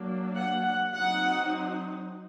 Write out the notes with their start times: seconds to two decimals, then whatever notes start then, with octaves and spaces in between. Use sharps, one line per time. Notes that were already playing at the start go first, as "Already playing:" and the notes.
Already playing: F#3 A#3 D4
0.34 F#5
0.64 F#5
0.94 F#3 C4 D#4 F#5